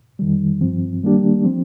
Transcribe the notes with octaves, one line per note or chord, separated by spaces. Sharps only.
F2 D#3 G3
G2 F3 C4
D#3 G3 A#3 D4 G4
F3 C4